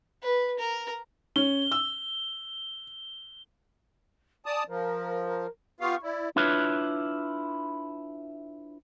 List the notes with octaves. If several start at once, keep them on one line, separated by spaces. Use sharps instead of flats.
B4
A#4
C#4 G7
E6
D5 G#5 A5 D#6
F3 A#4
B3 F4 G4 F5 C#6
E4 D5
D4 E4 F4 B4 C#5